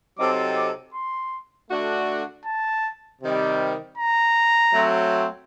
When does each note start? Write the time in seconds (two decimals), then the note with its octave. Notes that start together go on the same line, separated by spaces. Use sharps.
0.18 C3 F#3 C4 D#4 A4 D6
0.56 D6
0.94 C6
1.69 D3 A3 D4 F#4
2.46 A5
3.22 C3 D#3 G3
3.97 A#5
4.73 F#3 A3 C4